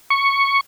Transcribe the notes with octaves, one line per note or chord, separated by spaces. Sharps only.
C#6